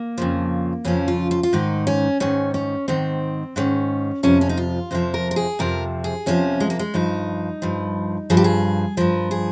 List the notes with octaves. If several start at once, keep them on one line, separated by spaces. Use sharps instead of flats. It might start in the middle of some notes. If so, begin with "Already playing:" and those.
Already playing: A#3
F2 C#3 F3
F2 C#3 F3 C#4
F4
F4
F4
G#2 D#3 D#4
C#4
G#2 D#3 C#4
C#4
G#2 D#3 C4
G#2 D#3 C#4
F2 C3 F3 C#4
C#4
D#4
F4
F2 C3 F3 C5
A#4
A#4
G#4
F2 C3 F3 A#4
G#4
F2 C3 F3 C#4
G#3
A#3
G#3
G2 F3 D#4
G2 F3
G2 F3 G#4
G4
G#4
G2 F3 A#4
G#4